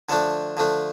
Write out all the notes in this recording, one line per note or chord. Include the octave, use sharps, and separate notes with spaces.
D3 F3 A3 D4 A4
D3 F3 A3 D4